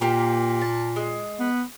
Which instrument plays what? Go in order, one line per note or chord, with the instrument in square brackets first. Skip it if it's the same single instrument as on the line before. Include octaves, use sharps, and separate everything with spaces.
[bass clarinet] A#2 [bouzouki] A#3 G4 A#5
[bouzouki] A5
G#3
[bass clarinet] B3